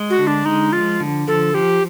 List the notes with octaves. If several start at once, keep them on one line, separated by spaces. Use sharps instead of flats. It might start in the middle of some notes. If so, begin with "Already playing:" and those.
Already playing: G#3
F#4
D3
D4
G#3 D#4
F3 F4
D3
F3 A4
F3 G4